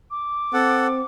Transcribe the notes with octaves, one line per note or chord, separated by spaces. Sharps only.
D6
C4 A4 F#5